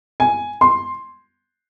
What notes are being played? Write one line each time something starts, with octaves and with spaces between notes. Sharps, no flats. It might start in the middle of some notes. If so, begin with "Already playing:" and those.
G#5
C6